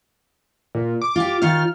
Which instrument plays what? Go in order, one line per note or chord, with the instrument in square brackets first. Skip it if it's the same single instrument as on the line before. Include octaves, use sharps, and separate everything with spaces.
[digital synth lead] A#2
D6
[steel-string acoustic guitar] F4 G4
[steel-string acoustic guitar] D#3 F4 C#5 [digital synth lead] F6